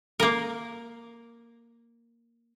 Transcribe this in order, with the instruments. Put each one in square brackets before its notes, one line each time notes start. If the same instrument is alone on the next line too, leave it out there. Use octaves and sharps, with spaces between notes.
[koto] A#3 A#4